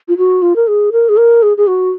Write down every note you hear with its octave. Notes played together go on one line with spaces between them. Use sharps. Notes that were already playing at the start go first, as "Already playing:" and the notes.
F4
F#4
F4
A#4
G#4
A#4
G#4
A#4
G#4
G#4
F#4